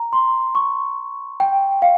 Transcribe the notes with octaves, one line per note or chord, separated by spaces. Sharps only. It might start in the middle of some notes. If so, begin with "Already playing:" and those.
Already playing: A#5
C6
C#6
G5
F5